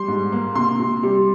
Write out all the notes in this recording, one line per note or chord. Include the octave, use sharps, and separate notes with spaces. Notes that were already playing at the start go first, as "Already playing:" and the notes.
Already playing: G3 C6
G#2
A#3
C3 C6
C3
G3